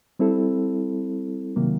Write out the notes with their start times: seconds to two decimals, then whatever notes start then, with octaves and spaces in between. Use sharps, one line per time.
0.19 G3 C4 E4 A4
1.56 C3 D#3 F#3 A#3